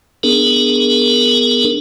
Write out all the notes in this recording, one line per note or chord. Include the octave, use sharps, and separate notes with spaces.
B3 D4 G#4 A#4